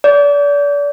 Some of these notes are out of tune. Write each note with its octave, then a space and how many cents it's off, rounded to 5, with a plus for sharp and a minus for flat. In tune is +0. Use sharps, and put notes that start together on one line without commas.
D5 -35